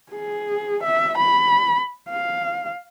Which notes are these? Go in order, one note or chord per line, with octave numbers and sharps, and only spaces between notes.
G#4
E5
B5
F5